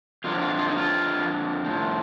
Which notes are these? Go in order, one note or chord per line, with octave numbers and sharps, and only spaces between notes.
F2 D3 F3 F4
F4
F4
D#4
F4
A2 F3